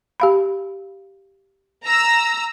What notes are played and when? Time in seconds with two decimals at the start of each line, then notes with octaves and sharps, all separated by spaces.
0.20 G4 F5 B5
1.83 A#5 E6